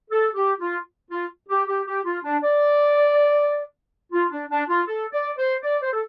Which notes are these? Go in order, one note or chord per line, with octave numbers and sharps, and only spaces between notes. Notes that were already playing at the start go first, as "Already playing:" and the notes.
A4
G4
F4
F4
G4
G4
G4
F4
D4
D5
F4
D4
D4
F4
A4
D5
C5
D5
C5
A4